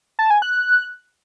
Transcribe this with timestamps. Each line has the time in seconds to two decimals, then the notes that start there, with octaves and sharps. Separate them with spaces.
0.19 A5
0.30 G#5
0.42 F#6